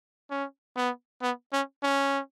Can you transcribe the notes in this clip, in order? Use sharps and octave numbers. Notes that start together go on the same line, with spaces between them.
C#4
B3
B3
C#4
C#4